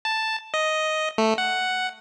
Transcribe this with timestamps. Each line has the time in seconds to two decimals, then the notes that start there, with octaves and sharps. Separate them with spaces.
0.05 A5
0.54 D#5
1.18 A3
1.38 F#5